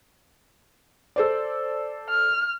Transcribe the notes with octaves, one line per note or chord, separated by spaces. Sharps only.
A4 C5 D5
F6